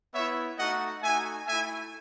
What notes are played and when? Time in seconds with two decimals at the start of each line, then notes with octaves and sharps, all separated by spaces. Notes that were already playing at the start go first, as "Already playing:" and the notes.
0.14 B3 E4 C#5 E5
0.58 A3 D#4 F#4 D#5 F#5
1.03 A3 D#4 F#4 E5 G#5
1.47 A3 E4 E5 G#5